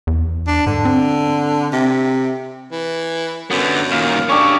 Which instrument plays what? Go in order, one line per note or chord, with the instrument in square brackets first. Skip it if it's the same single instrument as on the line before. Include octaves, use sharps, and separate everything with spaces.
[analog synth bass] E2
[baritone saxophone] D4
[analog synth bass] G#2 [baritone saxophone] D3
[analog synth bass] C4
[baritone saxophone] C3
E3
[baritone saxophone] F#2 [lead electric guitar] D3 B3
[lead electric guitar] A#2 D#3 [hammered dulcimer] F5
[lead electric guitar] C#4 A4 [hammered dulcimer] D4 G4 C#5